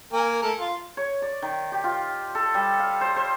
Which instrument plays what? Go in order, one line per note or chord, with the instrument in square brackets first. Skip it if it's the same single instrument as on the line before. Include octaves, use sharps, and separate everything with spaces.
[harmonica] A#3 A#4 G#5
A3 A#4
F4
[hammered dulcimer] C#5
D5
D#3
G4
F4
A4
G3
F5
C5
C5